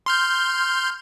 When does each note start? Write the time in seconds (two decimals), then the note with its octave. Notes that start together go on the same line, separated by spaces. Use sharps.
0.06 C6 F6 G6